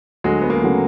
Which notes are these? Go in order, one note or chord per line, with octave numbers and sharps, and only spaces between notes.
D2 F#3 G#3
B3
G#3 A#3
C#3 F#3 A3